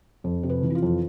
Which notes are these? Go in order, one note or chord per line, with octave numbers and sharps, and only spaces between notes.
F2
C3
B4
E3
E4
F4
F2